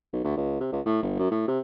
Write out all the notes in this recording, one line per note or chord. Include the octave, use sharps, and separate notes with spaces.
B1
D2
C#2
C3
C#2
A2
G1
F#2
A2
C3